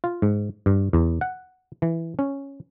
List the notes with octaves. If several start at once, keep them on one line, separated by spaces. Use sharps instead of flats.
F4
G#2
G2
E2
F#5
E3
C#4